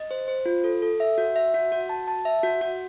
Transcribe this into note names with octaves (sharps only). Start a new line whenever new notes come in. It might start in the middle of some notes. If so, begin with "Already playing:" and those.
Already playing: D#5
C5
C5
F4
A4
A4
E5
F#4
E5
F#4
F#4
A5
A5
E5
F#4
F#4